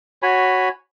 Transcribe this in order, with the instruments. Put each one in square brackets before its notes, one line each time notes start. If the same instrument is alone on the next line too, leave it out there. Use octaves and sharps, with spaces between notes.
[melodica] F#4 C#5 G#5 B5